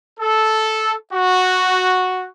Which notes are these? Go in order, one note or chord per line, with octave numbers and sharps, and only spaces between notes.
A4
F#4